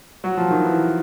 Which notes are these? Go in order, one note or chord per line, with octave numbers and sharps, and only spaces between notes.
F#3
F3
D#3
E3